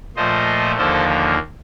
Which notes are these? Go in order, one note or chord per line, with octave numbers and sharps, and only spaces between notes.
A#2 F3 A3 C5 D#5
D#2 D3 F3 A#3 A4 C5